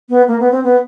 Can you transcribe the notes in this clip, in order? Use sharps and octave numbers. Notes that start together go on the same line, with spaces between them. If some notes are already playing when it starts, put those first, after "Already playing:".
B3
A#3
B3
C4
B3